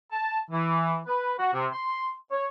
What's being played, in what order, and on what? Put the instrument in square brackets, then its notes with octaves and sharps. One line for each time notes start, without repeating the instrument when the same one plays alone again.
[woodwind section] A5
E3
B4
F#4
C3
C6
C#5